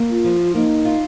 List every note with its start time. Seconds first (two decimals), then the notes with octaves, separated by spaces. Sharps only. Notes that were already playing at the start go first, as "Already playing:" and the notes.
Already playing: A#3
0.10 F4
0.24 F3
0.55 A#3 D#4
0.85 F4